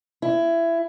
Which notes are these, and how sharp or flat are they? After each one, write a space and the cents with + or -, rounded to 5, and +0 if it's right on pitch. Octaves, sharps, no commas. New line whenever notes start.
E4 +20